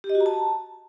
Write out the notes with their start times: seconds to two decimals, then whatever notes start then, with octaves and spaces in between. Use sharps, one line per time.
0.04 G4
0.10 D#5
0.15 F#4
0.20 A#5
0.26 A5